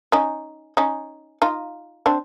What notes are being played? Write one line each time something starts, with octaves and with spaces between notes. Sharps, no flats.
C#4 D#4
C#4 D#4
D#4 F4
C4 D4